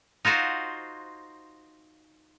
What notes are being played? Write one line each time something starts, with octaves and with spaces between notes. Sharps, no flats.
D#4 F4 F#4 C5